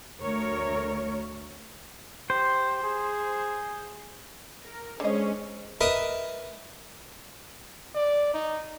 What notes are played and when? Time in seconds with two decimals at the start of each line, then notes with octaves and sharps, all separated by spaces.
0.21 D2 A3 A#4 C#5
2.30 G4 C5
2.83 G#4
4.64 A#4
5.00 D3 G#3 C#4 C5 C#5 D#5
5.81 A#4 B4 D#5 E5
7.95 D5
8.34 D#4